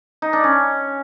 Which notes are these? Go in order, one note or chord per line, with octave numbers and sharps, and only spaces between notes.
D#4
D4
C#4